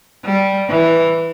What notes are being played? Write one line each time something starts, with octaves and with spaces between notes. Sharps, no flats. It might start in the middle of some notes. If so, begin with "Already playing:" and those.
G3
E3